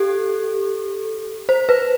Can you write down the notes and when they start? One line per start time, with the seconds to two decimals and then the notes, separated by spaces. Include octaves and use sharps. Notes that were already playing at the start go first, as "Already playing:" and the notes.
Already playing: G4 A4
1.49 C5
1.69 B4